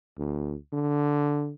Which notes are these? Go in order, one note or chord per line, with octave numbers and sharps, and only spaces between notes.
D2
D3